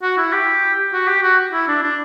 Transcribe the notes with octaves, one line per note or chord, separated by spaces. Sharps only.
F#4
E4
G4
F#4
G4
F#4
E4
D4
D4